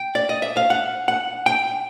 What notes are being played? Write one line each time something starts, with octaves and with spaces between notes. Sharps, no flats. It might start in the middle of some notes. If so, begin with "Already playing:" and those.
Already playing: G5
D5
D#5
E5
F5
F#5
F#5
G5